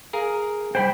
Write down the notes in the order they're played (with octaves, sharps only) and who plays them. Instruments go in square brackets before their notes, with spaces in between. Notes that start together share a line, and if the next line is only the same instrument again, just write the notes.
[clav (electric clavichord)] G#4 A#4 F5
[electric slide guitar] G3 C5 [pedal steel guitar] G5 B5